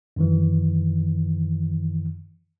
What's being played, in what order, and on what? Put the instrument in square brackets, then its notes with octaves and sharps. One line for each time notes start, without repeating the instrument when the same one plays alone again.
[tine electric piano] F#2 D#3 E3